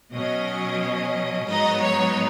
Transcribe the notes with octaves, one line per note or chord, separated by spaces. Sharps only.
B2 F#3 C#4 D#5
G#2 F#3 B3 D#4 D#5
C#5